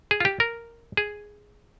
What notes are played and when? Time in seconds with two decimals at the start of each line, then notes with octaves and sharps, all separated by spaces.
0.11 G#4
0.20 F4
0.25 G4
0.40 A#4
0.97 G#4